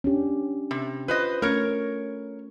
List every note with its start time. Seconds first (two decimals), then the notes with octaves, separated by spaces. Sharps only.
0.04 C#4 D4 G4
0.71 C3
1.08 F4 B4 C5 D#5
1.42 A3 C#4 A#4 C#5